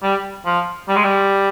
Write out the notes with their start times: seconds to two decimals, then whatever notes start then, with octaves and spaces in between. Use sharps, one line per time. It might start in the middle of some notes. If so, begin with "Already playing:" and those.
0.03 G3
0.46 F3
0.88 G3
0.96 G#3
1.04 G3